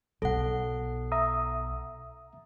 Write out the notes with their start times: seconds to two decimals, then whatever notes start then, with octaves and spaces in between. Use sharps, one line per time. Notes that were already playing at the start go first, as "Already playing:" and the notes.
0.22 B1 A4 F#5
1.12 E5 A#5 D#6